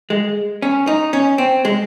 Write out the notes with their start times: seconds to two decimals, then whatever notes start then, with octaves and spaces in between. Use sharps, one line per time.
0.10 G#3
0.62 C#4
0.87 D#4
1.13 C#4
1.38 C4
1.65 G#3